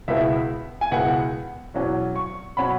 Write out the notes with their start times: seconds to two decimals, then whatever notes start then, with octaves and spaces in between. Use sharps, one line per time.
0.08 C#2 B2 B3 E4 E5
0.81 G#5
0.92 C#2 B2 B3 E4 F#5
1.74 E2 B2 F#3 C#4
2.16 C#6
2.57 B2 F#3 C#4 B5